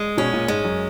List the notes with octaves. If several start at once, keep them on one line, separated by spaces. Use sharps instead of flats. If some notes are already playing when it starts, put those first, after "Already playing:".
Already playing: G#3
B2 C#4
A#2
G#2 G#3
F#2